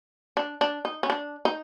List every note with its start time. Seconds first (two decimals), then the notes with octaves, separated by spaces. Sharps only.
0.37 D4
0.61 D4
0.85 D#4
1.03 C#4
1.10 D4
1.45 D#4